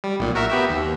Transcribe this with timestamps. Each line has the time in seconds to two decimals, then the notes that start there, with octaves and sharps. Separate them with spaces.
0.04 G3
0.19 B1 A#2
0.35 F#4 A#4 E5
0.50 B3 G4 E5
0.69 D#2